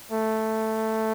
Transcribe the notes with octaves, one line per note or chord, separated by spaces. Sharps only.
A3